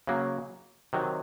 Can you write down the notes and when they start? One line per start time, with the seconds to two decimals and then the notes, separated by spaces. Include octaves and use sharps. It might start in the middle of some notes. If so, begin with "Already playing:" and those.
0.07 C#3 F#3 A#3
0.93 C3 D#3 F#3